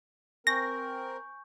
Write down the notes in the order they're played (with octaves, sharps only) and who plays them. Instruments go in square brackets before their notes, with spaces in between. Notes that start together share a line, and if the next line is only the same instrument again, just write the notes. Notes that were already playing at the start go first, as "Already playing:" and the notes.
[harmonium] C4 A#4 [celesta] G#5 C#6 G6 [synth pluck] A#6